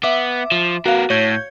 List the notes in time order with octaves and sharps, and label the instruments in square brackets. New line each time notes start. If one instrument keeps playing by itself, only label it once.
[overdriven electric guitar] B3 [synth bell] E5 D6
[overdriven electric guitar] F3
[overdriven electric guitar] B3 A#4 [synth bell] F#4 F5
[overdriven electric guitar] A2 [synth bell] C#5 G6 G#6